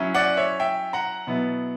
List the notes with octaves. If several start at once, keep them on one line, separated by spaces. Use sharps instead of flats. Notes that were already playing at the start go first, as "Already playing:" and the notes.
Already playing: F#3 C#4 E4
D5 F#5
C#5 E5
E5 G5
F#5 A#5
B2 F#3 B3 E4